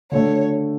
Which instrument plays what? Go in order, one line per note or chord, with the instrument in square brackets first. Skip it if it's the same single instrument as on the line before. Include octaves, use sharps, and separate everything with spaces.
[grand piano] D3 F#3 A3 [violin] C#5